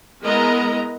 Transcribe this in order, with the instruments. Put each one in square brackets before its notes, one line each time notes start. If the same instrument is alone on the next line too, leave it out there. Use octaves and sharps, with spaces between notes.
[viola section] G#3 B3 E4 A#4 D#5 A#5